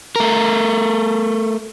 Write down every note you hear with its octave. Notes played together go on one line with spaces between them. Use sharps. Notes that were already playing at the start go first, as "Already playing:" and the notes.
A3 A#4